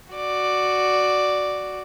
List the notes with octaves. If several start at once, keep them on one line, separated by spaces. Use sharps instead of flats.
F#4 D5